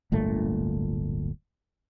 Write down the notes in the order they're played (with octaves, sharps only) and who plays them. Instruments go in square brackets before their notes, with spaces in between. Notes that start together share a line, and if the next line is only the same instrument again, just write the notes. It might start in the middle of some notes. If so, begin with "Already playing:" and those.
[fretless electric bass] D1 G1 A#2 A3